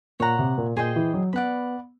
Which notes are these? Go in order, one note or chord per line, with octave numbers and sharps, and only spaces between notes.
A#2 C#5 F#5 A#5
C3
A#2
A#2 G#4 C5 D#5 G5
E3
F#3
B3 D5 F#5 B5